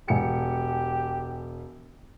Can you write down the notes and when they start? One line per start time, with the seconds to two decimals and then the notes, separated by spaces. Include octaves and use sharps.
0.08 E1 G4 G#5 C#7